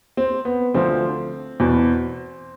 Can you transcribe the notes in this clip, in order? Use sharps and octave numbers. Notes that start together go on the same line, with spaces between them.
C4
B3
D2 D3 F3 C4
E2 B2